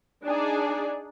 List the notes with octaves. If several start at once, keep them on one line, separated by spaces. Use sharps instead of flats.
D4 D#4 G#4 D5